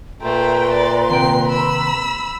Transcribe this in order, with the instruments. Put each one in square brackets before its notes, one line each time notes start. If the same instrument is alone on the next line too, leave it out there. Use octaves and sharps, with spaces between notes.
[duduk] A#2 [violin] A3 G5 [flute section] B4 A#5 C6
[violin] D5
[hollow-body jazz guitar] D#2 C3 G5 [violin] C7
[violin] B5 E6